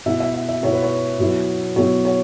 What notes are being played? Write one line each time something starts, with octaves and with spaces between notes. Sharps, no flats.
B2 B3 E4 E5
E5
E5
E5
B2 B3 E4 C#5
B4
C#5
B2 F#3 B3 E4
B2 F#3 B3 E4 C#5
C#5